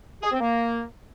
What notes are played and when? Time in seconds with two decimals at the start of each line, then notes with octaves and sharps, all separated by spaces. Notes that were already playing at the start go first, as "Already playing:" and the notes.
0.23 G#4
0.32 C4
0.40 A#3